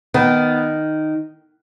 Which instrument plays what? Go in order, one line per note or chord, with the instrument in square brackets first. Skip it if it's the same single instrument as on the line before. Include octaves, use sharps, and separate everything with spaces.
[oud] D#3 [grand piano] B3